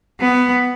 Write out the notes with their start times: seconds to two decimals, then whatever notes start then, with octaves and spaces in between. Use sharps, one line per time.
0.21 B3